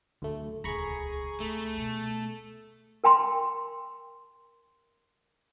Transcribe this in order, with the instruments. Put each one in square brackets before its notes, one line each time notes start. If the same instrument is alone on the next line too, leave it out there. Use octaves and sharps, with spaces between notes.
[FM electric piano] D2 A3 [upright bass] A2 F#3
[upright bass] D#1 C#2 [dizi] G#4 [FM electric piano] A#5 B5 C#6
[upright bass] D1 [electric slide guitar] A3
[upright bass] B2
[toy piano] A#4 G5 A#5 C6